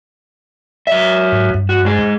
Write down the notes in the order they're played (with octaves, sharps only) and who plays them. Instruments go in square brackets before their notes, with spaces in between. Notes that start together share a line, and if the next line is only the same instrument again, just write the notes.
[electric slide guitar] F#3 E5
[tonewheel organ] G#2
G2
[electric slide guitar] F#4
G#2 G#4